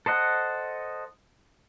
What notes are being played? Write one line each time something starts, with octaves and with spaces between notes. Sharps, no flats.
A4 C5 D#5 F#5